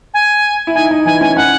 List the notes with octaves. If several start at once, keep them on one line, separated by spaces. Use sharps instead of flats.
G#5
E4
D#4 G#5
D#4
E3 G#5
C#4 G#5
C#4 F#5